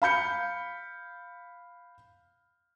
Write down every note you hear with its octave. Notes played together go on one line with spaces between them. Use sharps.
F5 B5 G6 C#7